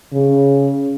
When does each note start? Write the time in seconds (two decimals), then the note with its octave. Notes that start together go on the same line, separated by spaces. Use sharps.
0.13 C#3